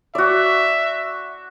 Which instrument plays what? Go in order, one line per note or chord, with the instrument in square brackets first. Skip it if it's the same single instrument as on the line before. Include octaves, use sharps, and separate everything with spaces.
[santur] F#4 D5 [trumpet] E5